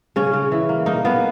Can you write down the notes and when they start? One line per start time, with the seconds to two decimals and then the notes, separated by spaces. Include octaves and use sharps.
0.16 C#3 C#4
0.33 C#3
0.52 E3
0.69 A#3
0.86 A#3 D#4
1.05 A#3 B3